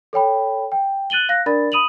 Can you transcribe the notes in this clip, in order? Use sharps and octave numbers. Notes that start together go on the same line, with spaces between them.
A4 C#5 G5 B5
G5
F#6 A6 D#7 F#7 G7
F5 F#6 A#6
D4 A#4 D5 B5 A6
B5 D#6 D#7 F7 F#7